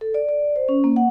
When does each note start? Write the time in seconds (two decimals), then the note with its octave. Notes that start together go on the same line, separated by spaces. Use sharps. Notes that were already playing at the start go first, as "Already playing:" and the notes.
0.01 A4
0.14 D5
0.29 D5
0.56 C5
0.69 C#4
0.84 A#3
0.96 F#5